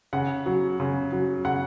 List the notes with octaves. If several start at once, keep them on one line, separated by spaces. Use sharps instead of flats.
C#3 F#5
F#3
C#3
F#3
C#3 F#5